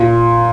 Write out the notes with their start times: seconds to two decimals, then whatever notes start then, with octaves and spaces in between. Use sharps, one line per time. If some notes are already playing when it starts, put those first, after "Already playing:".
Already playing: A#2